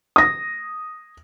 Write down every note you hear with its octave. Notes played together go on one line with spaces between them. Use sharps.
D#6 A#6